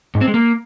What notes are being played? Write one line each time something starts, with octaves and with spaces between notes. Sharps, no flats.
G#2
C4
G#3
A#3